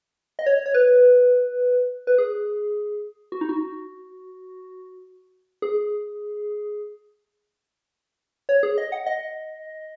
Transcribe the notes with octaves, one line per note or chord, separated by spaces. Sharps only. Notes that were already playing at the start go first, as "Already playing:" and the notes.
D#5
C#5
C#5
B4
B4
G#4
F#4
D#4
F#4
G#4
C#5
G#4
D#5
F#5
D#5